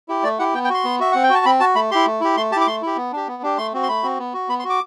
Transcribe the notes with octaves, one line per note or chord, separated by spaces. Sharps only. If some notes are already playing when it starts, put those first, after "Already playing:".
E4 G4
A3 D5
E4 G4 F#5
B3 G5
G5
F#4 C6
B3
F#4 E5
C4 F#5
G5
F#4 A5
C4 B5
F#4 A5
A3 B5
E4 G4 C6
A3
E4 G4
A3 C6
E4 G4 A5 D6
A3 C6
E4 G4
B3
D4 G4
B3
D4 G4
A3 C6
C4 F#4
C6
A3 B5
C4 F#4
B3
F#4
B3 B5
C6
F#4
D6